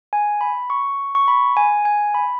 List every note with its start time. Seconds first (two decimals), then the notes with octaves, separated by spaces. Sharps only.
0.13 G#5
0.41 B5
0.70 C#6
1.15 C#6
1.28 B5
1.57 G#5
1.85 G#5
2.14 B5